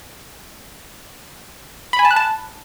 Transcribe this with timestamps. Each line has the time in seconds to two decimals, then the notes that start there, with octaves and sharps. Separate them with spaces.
1.93 B5
1.99 G#5
2.05 A5
2.11 F#6
2.16 A5